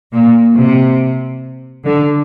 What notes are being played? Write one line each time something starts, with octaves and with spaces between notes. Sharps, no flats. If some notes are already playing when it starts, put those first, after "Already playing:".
A#2
C3
D3